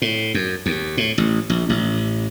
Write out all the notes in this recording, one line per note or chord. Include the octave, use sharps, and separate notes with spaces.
A2
F#2
D#2
A2
A1
A#1
A1